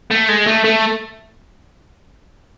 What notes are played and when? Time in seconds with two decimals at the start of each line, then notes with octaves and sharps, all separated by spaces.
0.11 A3
0.28 G#3
0.47 A3
0.64 A3